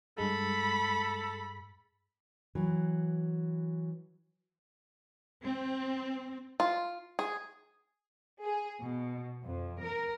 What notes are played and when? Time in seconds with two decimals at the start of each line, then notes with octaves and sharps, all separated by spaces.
0.18 G2 G#3 A4 B5
2.55 E3 F#3
5.43 C4
6.60 F4
7.19 G#4
8.43 G#4
8.81 B2
9.44 F2
9.80 A#4